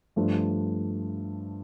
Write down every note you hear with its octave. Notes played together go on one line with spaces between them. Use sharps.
G2 F3 A3 D4